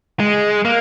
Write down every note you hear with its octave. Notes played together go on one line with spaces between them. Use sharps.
G#3
A#3